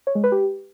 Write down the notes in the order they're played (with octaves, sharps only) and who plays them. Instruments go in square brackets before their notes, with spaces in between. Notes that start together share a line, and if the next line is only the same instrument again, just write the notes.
[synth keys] C#5
G#3
B4
G4